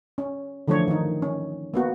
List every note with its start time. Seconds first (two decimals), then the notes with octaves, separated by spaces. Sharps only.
0.18 C#4
0.68 D3 E3 F3 A3 D4 C#5
0.88 D#3 D#4
1.22 C#4
1.74 A#3 B3 F#4